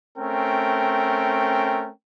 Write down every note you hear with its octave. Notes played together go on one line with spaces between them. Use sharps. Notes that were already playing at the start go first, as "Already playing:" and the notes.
A3 C4 C#4 A#4 G5